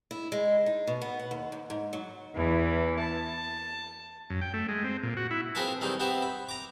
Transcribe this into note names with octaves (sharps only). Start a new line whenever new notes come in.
E4
G#3
D#4
B2
B3
F#5
D#2
G#2
G#2
F#3
E2 E3
A5
F#2
G5
A3
G#3
C4
A#2
F#4
E4
C4 F4 G#4 A#4 B4 A5
D#3 E3 G3 C4 D#4
B3 C4 E4 G4 E5
B5
A#5 D6